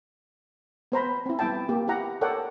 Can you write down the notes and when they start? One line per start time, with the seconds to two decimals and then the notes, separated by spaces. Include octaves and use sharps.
0.92 B3 C5 A#5 B5
1.26 C4 E4
1.39 G3 B3 E4 E5 G5 A5
1.69 A#3 G4
1.88 E4 G4 E5 F#5 A#5
2.21 A4 A#4 C#5 D5 F#5 G5